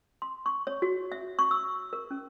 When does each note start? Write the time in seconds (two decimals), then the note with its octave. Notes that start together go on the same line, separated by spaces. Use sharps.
0.22 C6
0.46 C#6
0.67 C#5
0.82 F#4
1.12 E5
1.39 C#6
1.51 E6
1.93 A#4
2.11 C#4